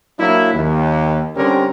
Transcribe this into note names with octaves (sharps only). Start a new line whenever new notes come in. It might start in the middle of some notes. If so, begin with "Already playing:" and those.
F#3 A#3 D4 E4
D#2
D3 G3 C4 C#4 G4 A#4